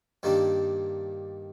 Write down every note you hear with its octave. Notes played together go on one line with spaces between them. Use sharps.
G2 D#3 G3 A#3 D4